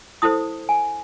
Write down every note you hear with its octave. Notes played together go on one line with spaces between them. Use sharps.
E4 A4 C5 D#6
G#5